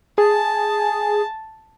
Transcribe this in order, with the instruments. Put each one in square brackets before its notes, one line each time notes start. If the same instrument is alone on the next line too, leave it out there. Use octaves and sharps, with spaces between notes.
[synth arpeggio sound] G#4 [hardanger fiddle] A5